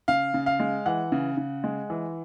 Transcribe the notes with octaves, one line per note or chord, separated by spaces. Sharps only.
C#3 F5
C#3
F5
G#3
E3 F#5
C#3
C#3
G#3
E3